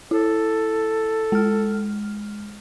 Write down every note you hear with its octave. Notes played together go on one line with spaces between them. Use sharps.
E4 A4
G#3 F6